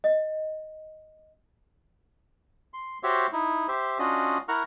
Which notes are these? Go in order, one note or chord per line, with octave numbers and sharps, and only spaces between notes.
D#5
C6
F#4 G4 C5 C#5 E5
D#4 E4
G4 C5 E5
C#4 D4 F4 F#4 D#5
E4 A#4 F#5 A#5 C#6 F6